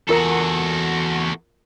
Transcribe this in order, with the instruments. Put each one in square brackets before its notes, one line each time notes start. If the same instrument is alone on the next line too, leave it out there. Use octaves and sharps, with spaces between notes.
[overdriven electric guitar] E2 [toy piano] F4 A#4 A#5 [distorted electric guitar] F#4 A4